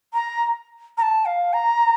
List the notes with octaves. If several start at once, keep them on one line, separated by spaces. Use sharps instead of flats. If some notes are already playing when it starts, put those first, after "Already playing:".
A#5
A#5
A5
F5
A#5